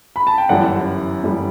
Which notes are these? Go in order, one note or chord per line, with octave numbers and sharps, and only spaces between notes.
B5
A5
G5
G1 F#2 E3 G3 D5 F#5
G1 F#2 E3 G3